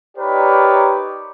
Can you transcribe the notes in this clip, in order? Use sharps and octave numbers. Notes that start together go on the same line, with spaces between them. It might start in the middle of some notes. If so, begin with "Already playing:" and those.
D#4 G4 A#4 B4 C#5 D5